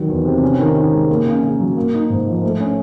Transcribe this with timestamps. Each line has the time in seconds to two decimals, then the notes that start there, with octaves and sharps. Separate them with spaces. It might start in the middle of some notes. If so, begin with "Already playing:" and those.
Already playing: D#3 F#3
0.08 E2
0.25 C3
0.42 C#4
0.59 D#3
0.76 D#3
0.93 G#3
1.09 A#3
1.26 C#3
1.43 C#3
1.60 F#3
1.77 A#3
1.93 D#4
2.10 G#2
2.27 F3
2.43 A3
2.60 C#4